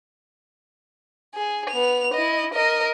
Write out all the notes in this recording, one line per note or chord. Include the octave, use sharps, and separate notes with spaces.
G#4
B3 F7
E4 D#5
A#4 D#5